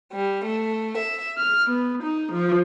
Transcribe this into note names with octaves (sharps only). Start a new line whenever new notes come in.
G3
A3
E5
F6
B3
D#4
F3